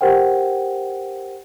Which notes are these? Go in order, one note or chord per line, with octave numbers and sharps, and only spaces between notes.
G4 A#4 C5 F#5 G5